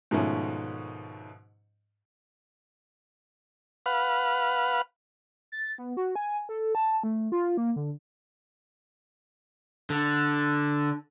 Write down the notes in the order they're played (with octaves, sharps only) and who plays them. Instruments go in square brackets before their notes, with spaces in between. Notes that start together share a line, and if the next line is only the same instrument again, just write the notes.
[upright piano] G#2 B2 D#3 F3 A3 C#4
[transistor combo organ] B4 F5 F#5
[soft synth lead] A6
B3
F#4
G#5
A4
A5
A3
F4
A#3
D3
[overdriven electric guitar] D3